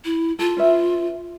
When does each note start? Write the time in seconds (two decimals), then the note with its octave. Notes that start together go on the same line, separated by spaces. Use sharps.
0.05 E4
0.39 F4 A4
0.57 C#4 B4 E5